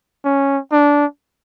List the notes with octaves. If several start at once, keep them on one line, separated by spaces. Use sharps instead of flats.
C#4
D4